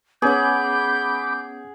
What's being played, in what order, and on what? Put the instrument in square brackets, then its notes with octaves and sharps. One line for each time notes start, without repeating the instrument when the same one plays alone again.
[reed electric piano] B3 C#4 [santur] G#4 F#5 [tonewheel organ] B5 D6 [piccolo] G6